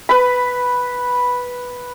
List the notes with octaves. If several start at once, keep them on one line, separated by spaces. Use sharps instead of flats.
B4 B5